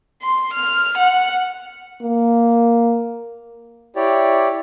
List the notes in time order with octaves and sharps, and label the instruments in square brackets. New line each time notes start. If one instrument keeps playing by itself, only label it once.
[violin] C6
F6
F#5
[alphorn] A#3
[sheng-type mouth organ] E4 G4 C#5 D5